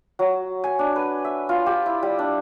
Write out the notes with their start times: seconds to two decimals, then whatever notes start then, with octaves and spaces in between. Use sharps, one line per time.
0.19 F#3
0.64 G#5
0.79 D4
0.96 B4
1.24 E5
1.49 F4
1.66 G4
1.86 E4
2.03 G3
2.19 D4